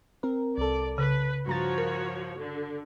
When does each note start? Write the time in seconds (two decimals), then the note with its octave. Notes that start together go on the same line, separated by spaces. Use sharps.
0.23 C4 A#4
0.58 C2 A4 D5
0.98 C#3 B4
1.47 G2 F3 F#4 C#5 A#5 A6
1.78 A#4
2.38 D3